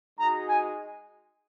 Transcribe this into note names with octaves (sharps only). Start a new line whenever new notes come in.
G#3 D#4 F#4 A#5
G#5